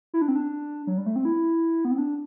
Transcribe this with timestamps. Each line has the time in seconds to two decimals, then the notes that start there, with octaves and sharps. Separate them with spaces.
0.14 E4
0.22 D4
0.28 C4
0.35 D4
0.87 F#3
0.97 G3
1.06 A3
1.16 C4
1.25 E4
1.85 B3
1.91 C4
1.98 D4